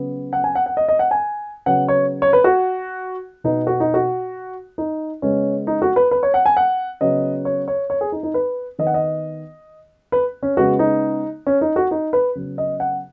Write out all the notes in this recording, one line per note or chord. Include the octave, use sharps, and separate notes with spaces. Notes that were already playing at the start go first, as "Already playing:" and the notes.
Already playing: C#3 F#3 B3
F#5
G#5
F#5
F#5
D#5
D#5
F#5
G#5
C#3 F#3 B3 F#5
C#5
C#5
B4
F#4
B2 B3 D#4
F#4
D#4
F#4
D#4
C#3 G#3 B3 C#4
D#4
F#4
B4
B4
C#5
F#5
G#5
F#5
C#3 F#3 B3 D#5
C#5
C#5
C#5
G#4
D#4
D#4
B4
D#3 B3 D#5
F#5
D#5
B4
C#4
C#3 G#3 B3 F#4
D#4
C#4
D#4
F#4
D#4
B4
C#3 F#3 B3
D#5
F#5